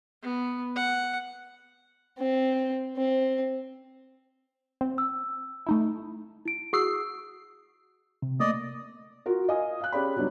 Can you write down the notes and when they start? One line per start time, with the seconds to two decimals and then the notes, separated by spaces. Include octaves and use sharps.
0.23 B3
0.76 F#5
2.18 C4
2.97 C4
4.81 C4
4.98 E6
5.66 A3 D#4 E4
6.45 E4 D7
6.73 F#4 G#4 D#6 E6 C7
8.22 C3
8.40 A3 A#3 D5 D#5 D#6
9.26 F4 F#4 A#4
9.48 F4 D#5 F5 G#5 D#6
9.81 F5 F#6
9.92 C#4 G4 G#4 D5 B5
10.16 C#3 F#3 G3 B3 D4 D#4